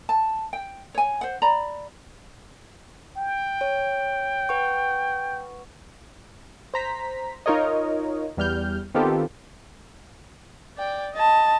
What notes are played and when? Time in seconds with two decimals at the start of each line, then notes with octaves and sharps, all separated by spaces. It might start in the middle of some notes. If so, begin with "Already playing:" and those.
0.09 A5
0.53 G5
0.95 C#5 G#5
1.21 C5 F#5
1.42 D5 A#5 B5
3.17 G5
3.61 C#5
4.49 B4 F#5 C#6
6.74 C5 A#5 B6
7.46 D#4 F4 A#4 C#5 D#5
8.37 E2 G3 F6 G6
8.95 D#3 B3 C4 F4 G4 A4
10.78 D5 G5
11.14 D#5 A5